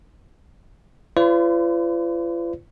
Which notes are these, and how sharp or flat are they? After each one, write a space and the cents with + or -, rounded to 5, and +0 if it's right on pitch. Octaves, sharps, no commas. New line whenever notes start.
F4 -40 B4 +45 D5 -40